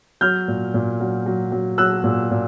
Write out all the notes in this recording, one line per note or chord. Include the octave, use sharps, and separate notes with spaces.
F#3 F6 G6
A#2
A#2
F#3
F#3
F#3
F#3 E6 F#6
A#2
A#2